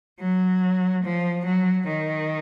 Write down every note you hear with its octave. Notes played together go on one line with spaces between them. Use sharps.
F#3
F3
F#3
D#3